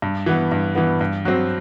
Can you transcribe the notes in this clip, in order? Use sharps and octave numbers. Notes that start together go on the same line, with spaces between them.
G2
E3 B3
G2
E3 B3
G2
F#3 C4